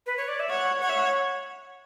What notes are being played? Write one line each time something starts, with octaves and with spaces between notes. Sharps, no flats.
B4
C#5
D5
E5
C#5 F#5
C#5 F#5
E5
F#5